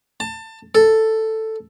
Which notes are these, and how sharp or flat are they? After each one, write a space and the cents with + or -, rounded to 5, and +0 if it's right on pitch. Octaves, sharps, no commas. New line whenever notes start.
A5 +25
A4 +5